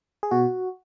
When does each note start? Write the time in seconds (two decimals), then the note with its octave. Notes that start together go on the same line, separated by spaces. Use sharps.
0.23 G#4
0.31 B2 F#4